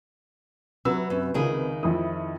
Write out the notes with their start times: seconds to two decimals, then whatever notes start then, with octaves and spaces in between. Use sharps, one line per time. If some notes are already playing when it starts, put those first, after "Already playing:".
0.85 C3 F#3 F#4 B4 E6
1.10 F#2
1.34 C#2 D#3 G#4
1.83 F2 E4 D#6